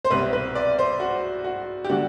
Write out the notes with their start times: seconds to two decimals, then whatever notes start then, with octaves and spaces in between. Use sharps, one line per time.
0.05 C5
0.10 C2 B2 G3 C4 B4
0.33 B4
0.55 D5
0.78 C5
1.00 F#4
1.44 F#4
1.84 G4
1.90 D3 G3 B3 D4 F#4